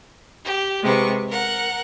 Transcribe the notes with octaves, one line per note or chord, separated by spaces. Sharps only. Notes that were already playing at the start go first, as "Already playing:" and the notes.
G4
C3 G#3 B3 C#6
A#4 F#5